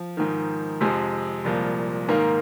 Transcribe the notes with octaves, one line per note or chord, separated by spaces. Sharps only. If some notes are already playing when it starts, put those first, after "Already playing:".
Already playing: F3
G#2 D#3
F2 C3 F3 G#3
C2 A#2 F3
G#2 D#3 A#3